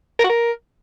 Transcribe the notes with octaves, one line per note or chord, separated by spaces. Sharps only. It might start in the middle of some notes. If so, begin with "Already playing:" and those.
A#4
F#4
A#4